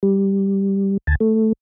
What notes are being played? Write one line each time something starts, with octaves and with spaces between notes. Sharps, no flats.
G3
D2 G#5 A5
A3